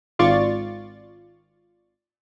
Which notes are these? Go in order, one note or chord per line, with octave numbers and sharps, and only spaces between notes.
G#1 F4 D5 C#6 A6